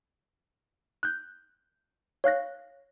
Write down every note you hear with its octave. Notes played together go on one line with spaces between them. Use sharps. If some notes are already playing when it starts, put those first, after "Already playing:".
F#6 G6
C#5 F5 F#6 A#6